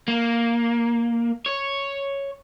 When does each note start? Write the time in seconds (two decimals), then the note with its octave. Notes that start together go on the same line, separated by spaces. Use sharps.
0.08 A#3
1.46 C#5